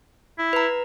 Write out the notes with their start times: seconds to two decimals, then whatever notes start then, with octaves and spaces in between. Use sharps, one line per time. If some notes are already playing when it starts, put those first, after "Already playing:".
0.38 E4
0.53 B4 A#5